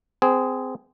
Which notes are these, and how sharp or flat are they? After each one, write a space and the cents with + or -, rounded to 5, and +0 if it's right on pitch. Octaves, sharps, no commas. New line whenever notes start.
C4 -25 G#4 +0